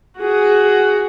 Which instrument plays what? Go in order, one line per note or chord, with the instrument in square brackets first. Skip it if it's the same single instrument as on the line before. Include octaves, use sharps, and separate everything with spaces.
[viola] F#4 G#4